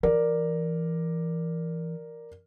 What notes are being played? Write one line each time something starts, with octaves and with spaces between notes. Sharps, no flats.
E3 A#4 D5